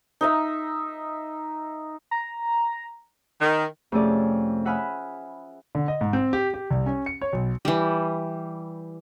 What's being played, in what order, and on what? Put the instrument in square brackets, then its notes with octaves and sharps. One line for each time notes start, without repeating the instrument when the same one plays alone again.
[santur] D#4 D#5 E5
[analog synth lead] A#5
[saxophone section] D#3
[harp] F2 C3 A3 C#4 G#4 D5
E5 F#5 G#5 B5 D#6 F6
[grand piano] D3
D#5
G#2
C4
G4
G4
C2
C#4
C#7
C#5
B1
[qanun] E3 G3